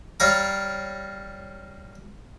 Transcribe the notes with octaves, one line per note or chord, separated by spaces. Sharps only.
G3 C#5 F5 A#5 D6